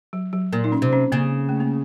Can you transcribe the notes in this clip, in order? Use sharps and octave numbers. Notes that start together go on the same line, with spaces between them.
F#3
F#3
A#2 A#3
D#4
C#4
C3
C#4
C#3 A#3
A3
A#3